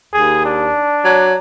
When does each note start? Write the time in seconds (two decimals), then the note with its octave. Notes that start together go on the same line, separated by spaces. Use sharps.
0.13 D#2 G#4
0.45 D4
1.04 F#3